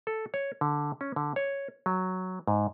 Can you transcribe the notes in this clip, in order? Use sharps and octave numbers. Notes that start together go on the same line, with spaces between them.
A4
C#5
D3
C#4
D3
C#5
F#3
G#2